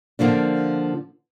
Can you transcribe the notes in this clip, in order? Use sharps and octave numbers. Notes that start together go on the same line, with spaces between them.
D3 F3 A#3 D4